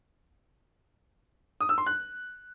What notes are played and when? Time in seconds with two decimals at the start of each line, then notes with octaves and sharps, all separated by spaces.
1.61 D#6
1.69 E6
1.78 C6
1.86 F#6